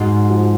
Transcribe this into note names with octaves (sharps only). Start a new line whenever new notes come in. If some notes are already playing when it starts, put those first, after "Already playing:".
Already playing: G#2 F#4
F3